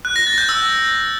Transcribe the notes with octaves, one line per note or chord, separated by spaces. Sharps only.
F#6
A#6
A6
G6
E6